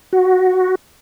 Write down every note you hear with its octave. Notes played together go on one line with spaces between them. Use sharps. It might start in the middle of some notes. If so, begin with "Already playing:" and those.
F#4